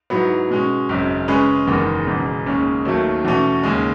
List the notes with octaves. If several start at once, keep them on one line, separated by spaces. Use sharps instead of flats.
G#2 F#3 B3 E4
B2 G#3 C#4
G#1 F#2 C#3
C#3 G#3 C#4 G#4 B4
F#1 E2 D#3 G#3
E1 E2 C#3
D#2 C#3 G#3 C#4
D#2 D#3 F#3 A3
E2 B2 A3 C#4
D#2 C#3 G#3